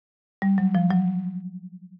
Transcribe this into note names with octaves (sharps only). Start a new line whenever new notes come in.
G3
F#3
F3
F#3